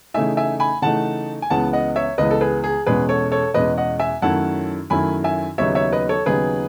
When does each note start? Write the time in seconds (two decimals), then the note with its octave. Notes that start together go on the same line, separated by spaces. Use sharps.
0.14 C#3 E3 A3 D#4 E5 G#5
0.37 E5 G#5
0.60 G#5 B5
0.82 C#3 E3 A3 D#4 F#5 A5
1.42 G#5
1.50 C#2 C#3 E3 B3 F#5 A5
1.73 D#5 F#5
1.96 C#5 E5
2.18 C#2 C#3 E3 B3 B4 D#5
2.31 A4
2.41 G#4 B4
2.64 G#4
2.86 E2 B2 G#3 C#4 G#4 B4
3.09 A4 C#5
3.32 A4 C#5
3.54 E2 B2 G#3 C#4 B4 D#5
3.77 D#5 F#5
3.99 E5 G#5
4.22 F#2 D#3 A3 C#4 E4 F#5 A5
4.90 F#2 D#3 A3 C#4 E4 G#5 B5
5.24 E5 G#5
5.58 D#2 C#3 F#3 B3 D#4 C#5 E5
5.75 C#5 E5
5.92 B4 D#5
6.09 A4 C#5
6.26 D#2 C#3 F#3 B3 D#4 G#4 B4